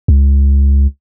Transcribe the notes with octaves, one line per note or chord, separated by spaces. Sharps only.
C#2